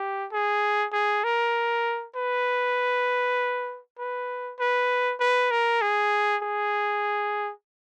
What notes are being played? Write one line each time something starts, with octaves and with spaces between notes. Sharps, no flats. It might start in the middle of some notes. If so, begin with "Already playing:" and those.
Already playing: G4
G#4
G#4
A#4
B4
B4
B4
B4
A#4
G#4
G#4